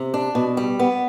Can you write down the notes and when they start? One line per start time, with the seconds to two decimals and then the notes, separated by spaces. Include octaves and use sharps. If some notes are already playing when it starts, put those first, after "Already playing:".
Already playing: C3
0.14 D4
0.35 B2
0.57 G3
0.79 B3